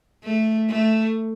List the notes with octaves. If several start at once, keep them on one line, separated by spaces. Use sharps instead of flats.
A3
A3